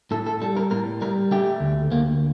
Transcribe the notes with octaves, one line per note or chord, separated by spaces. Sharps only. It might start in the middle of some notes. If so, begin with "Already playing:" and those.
A2 A4
A4
G3 A4
A#4
A2 A#4
G3 A#4
A3 G4
D2
D2 A#3